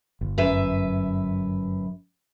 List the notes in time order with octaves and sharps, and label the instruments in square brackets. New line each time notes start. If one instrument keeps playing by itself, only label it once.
[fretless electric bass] G1
[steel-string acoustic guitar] F#2 B4 E5